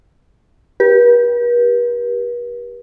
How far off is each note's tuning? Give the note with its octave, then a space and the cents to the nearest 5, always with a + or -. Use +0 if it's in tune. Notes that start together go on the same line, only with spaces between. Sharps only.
G4 +0 B4 -45